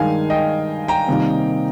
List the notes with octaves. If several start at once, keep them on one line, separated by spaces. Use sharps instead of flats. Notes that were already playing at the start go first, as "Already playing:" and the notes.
Already playing: G2 D#3 G#3 D#4 F5 G#5
D#5 G5
G5 A#5
C3 D#3 G3 A#3 D#4